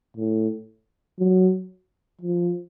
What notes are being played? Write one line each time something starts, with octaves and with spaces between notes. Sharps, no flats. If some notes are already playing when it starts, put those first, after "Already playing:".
A2
F#3
F3